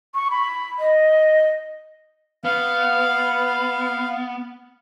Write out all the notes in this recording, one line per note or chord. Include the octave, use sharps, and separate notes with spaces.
C#6
B5
D#5
B3 F5